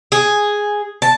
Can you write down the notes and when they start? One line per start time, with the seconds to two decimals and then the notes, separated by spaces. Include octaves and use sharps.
0.12 G#4
1.02 A5